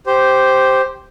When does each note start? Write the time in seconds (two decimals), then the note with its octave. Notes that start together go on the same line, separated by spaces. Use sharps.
0.06 G4 C5